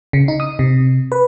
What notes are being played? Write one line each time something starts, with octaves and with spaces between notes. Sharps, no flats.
C#3
D#4
D#6
C3
B4